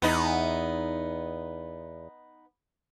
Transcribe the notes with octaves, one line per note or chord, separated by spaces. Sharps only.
E2 B3 D#4